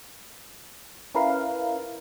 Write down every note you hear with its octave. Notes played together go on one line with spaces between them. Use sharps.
C#4 E4 A#4 B4 F5